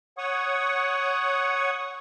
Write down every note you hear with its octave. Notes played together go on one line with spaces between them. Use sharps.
C#5 F#5 C#6 D#6